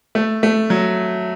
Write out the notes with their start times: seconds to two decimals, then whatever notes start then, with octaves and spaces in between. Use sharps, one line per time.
0.15 A3
0.43 A3
0.70 F#3